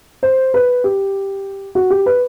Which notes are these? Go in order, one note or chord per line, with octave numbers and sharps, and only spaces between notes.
C5
B4
G4
F#4
G4
B4